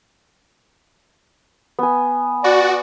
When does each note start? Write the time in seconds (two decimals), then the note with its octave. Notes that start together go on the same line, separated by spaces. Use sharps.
1.79 B3 G#5
2.44 F#4 D5